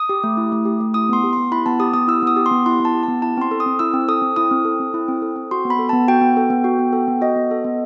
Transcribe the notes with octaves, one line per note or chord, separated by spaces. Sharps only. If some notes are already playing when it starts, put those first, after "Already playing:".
Already playing: D#6
G4
A3
E4
A3
G4
A3
E4 D#6
B3 C6
G4
B3 C6
E4 B5
B3 A5
G4 D#6
B3 D#6
E4 E6
B3 D#6
G4
C6
B3
E4 C6
B3 A5
G4
A5
B3
E4 A5
C4 C6
A4
D#6
C4
E4 E6
C4
A4 D#6
C4
E4 D#6
C4
A4
C4
E4
C4
A4
C4
F#4 C6
B3
B5
A4
B3 A5
F#4 G5
B3
A4
B3
F#4
B3
A4
B3
F#4 D#5
B3
A4
B3